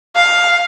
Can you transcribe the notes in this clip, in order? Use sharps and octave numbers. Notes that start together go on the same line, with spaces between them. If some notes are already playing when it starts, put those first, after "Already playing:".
F5